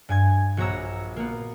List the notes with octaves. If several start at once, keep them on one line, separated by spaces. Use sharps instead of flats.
G2 G#5 G#6
A#1 F#4 C#5 A#5 E6
A#3 B3